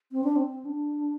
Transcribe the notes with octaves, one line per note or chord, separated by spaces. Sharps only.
C4
D4
C4
D4